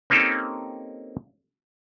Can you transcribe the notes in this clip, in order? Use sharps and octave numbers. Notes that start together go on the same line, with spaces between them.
A#3 C4 C#4 D#4 G4 A4